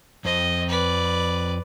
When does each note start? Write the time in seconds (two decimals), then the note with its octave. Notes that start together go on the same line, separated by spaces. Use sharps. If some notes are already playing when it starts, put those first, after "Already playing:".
0.25 F2 C5 D#5
0.68 B4 D5